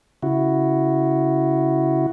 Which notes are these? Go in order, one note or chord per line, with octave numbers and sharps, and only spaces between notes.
C#3 E4 F#4